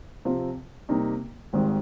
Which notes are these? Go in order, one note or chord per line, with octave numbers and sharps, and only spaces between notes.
C3 F3 C4 F4
C3 G3 A#3 D#4
G#1 G#2 D#3 G3 C4